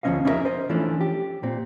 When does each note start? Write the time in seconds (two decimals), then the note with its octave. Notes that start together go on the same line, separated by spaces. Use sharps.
0.03 D2 F3 C4 C#4 D#5 F5
0.25 C#4 D#4 E4 G#4 A#4 E5
0.45 C5 D#5
0.69 E3 F3 A3 C#4 D4
1.01 G4
1.43 A#2 C4